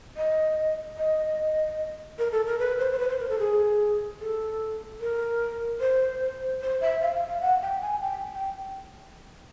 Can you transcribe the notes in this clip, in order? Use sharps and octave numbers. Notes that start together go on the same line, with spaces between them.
D#5
D#5
A#4
A4
A#4
B4
C5
C5
B4
C5
A#4
A4
G#4
A4
A#4
C5
C5
E5
F5
F5
F5
F#5
G5
G#5
G5
G5